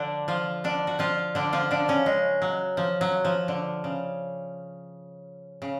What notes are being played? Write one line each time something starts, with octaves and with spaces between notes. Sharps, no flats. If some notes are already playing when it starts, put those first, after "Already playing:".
Already playing: D3 F3 D4
F3 F4
D3 D4
F#4
F3 F4
D3 D4
F3 F4
D3 D4
C#3 C#4
G#3
F#3
F3
F#3
F3
D3
C#3
C#3